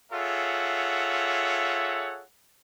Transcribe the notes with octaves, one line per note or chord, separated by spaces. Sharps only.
F4 G#4 A4 C#5 E5 F#5